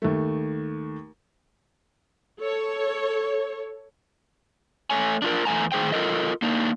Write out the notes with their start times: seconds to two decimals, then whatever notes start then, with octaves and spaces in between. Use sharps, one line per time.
0.02 D#2 A3
2.40 A4 C#5
4.90 A3 C#5 G#5
5.22 D4 F4 A#4
5.45 E2 A3 G#5 A#5
5.72 A2 D#3 G#4 C5 G5
5.92 F4 A4 A#4 D#5
6.42 A#3 D4 D#4